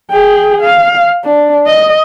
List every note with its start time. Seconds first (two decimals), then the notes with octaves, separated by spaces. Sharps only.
0.11 G#4 G5
0.62 F5
1.24 D4
1.66 D#5